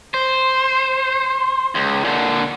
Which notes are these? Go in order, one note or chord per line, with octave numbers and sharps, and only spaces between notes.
C5
C#2
A#2 D3